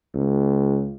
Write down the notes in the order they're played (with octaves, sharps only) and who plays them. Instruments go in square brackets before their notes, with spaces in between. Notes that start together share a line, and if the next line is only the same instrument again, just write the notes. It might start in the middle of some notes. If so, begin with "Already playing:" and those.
[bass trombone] C#2